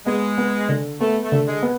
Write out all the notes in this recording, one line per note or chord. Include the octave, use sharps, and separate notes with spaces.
G#3 B3
B3
D3
A3 B3
A3
D3
G#3
B3